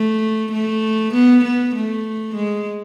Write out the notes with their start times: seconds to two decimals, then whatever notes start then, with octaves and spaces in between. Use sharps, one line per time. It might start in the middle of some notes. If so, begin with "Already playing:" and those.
Already playing: A3
0.52 A3
1.14 B3
1.45 B3
1.75 A3
2.36 G#3